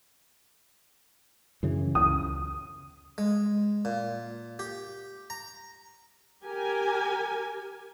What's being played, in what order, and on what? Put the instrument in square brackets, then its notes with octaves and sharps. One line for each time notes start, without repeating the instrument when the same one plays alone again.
[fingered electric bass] F#2 C#3 E3
[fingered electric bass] C#2 [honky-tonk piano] D#6
[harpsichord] G#3
A#2
G4
A#5
[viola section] G4 A#4 G#5